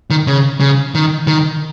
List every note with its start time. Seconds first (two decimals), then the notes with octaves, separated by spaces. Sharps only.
0.10 D#3
0.27 C#3
0.60 C#3
0.95 D#3
1.27 D#3